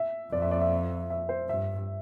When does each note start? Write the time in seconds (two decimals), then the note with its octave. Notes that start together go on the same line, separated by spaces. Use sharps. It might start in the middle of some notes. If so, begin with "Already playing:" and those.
Already playing: E5
0.32 F2 D5
0.42 E5
0.51 D5
0.61 E5
1.10 E5
1.29 C5
1.49 G2 E5